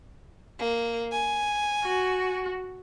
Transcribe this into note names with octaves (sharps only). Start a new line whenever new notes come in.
A#3
G#5
F#4